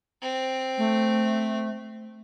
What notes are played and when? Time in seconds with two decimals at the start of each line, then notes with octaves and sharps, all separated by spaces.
0.22 C4
0.78 A3